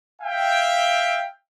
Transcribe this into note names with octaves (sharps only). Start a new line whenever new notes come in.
E5 F5 G5